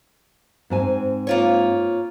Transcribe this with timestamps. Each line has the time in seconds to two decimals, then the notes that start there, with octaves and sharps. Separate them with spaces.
0.70 G#2 C4 G#5
1.27 A#3 F4 C#5